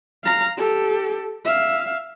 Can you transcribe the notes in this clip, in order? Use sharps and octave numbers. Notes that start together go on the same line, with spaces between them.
F5 A#5
G4 A4
E5 F5